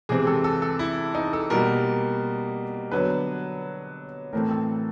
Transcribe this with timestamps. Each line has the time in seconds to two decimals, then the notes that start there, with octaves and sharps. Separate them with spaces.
0.09 C3 E3 G#3 C4 G#4
0.27 A4
0.44 A4
0.62 A4
0.79 E4
1.15 D#4
1.33 A4
1.50 B2 G3 A#3 A#4
2.92 D3 F#3 B3 B4
4.33 A2 E3 A3 C4 A#4
4.51 A4